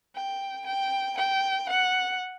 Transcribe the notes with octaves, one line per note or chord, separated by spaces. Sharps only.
G5
G5
G5
F#5